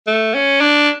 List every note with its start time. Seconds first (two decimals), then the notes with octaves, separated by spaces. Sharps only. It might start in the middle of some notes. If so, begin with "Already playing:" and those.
0.07 A3
0.34 C#4
0.61 D4